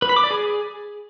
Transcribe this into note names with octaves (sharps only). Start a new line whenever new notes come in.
B4
B5
D6
D5
G#4